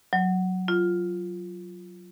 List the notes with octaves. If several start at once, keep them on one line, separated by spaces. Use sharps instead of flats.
F#3
F4